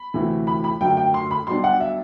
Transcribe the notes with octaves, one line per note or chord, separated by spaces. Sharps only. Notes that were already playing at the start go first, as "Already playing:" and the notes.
Already playing: B5
D2 C3 E3 A3
B5
B5
F#2 D3 A3 G5
G5
C6
B5
B1 B2 G3 D4 C6
F#5
E5